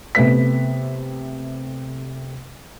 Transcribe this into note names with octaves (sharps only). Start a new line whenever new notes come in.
C3 A3 B3 B6